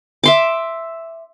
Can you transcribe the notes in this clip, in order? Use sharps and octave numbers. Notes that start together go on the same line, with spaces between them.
E5 C6 D6